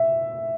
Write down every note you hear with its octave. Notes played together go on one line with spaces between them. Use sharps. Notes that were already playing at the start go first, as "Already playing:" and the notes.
Already playing: E5